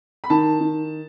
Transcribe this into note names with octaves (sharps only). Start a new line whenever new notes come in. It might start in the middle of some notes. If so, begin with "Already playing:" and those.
B5
D#3 A5
D#3